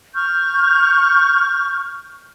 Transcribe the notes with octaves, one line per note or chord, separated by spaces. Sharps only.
C#6 F6 G6